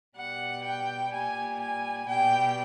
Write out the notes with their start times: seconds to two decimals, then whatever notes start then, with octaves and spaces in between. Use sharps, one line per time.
0.16 B2 G3 F#5
0.64 G5
1.12 A#2 G3 G#5
1.60 G#5
2.08 B2 G3 G5